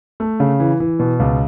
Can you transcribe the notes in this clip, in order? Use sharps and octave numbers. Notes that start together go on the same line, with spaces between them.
A3
C#3
E3
E3
B2
C#2